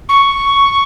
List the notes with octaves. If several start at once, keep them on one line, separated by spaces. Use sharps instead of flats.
C#6